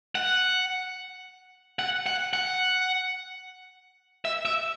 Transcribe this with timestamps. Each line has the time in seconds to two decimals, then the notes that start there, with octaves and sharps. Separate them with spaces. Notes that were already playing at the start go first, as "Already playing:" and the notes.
0.15 F#5
1.79 F#5
2.06 F#5
2.33 F#5
4.25 E5
4.45 E5